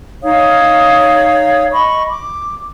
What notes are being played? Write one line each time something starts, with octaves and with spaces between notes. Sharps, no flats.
D#4 C#5 F5 D#6
D#5 B5 C#6
D6